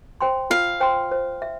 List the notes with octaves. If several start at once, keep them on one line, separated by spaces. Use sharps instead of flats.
C5 G5 C6
F4 F5
C5 G5 C6
C5
E5